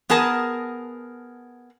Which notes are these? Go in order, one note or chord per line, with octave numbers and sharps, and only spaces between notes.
B3 G#4 A#4 A5